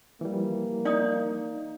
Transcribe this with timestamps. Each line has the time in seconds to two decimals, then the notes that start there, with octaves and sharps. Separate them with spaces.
0.21 E3 F3 G3 A#3
0.85 D#4 D5 D#6